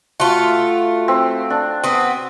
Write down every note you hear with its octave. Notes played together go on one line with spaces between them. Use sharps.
A3 F4 F#4
C4
D4
B3 C4 D#6